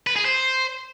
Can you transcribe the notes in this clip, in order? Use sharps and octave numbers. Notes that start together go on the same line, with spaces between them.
B4
G#4
C5